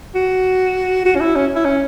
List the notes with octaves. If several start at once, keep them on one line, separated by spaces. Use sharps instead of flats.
F#4
F#4
C#4
E4
C#4
E4
C#4